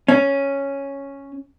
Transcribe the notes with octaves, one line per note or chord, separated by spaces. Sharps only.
C#4